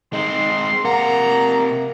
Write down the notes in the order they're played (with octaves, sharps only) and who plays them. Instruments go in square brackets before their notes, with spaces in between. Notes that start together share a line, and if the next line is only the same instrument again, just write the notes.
[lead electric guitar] G#3 C4 [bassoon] D#4 [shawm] C6
[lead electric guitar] C3 F#5 [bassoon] A#3 [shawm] A#5